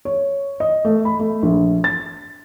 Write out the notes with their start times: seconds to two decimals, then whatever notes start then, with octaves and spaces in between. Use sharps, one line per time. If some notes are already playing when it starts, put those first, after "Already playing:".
0.05 C#5
0.60 D#5
0.85 A3
1.05 B5
1.19 A3
1.43 A#1
1.84 A6